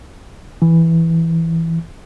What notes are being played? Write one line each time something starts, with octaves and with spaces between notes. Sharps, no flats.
E3